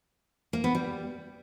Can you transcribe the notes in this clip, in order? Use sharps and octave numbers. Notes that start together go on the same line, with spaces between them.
A#3
B3
G3